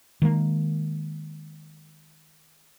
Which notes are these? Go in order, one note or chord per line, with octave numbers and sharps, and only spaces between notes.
D#3 G#3 A#3